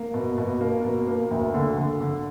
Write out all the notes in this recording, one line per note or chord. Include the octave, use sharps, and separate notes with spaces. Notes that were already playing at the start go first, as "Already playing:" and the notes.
Already playing: A#3
B2
B2
A#3
B2
A#3
D2
D3
D3
D3